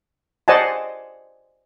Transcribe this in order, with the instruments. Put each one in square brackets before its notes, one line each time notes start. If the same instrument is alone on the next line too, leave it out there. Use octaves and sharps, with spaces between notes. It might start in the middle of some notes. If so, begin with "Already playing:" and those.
[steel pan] C5 D5 D#5 F#5 G#5 A5